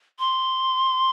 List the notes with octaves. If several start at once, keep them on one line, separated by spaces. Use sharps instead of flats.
C6